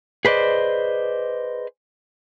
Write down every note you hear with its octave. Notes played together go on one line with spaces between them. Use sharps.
G#4 B4 C5 D5 D#5